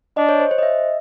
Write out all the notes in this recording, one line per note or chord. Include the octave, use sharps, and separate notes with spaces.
D4 D#5
C#5
C5
C5
D#5
E5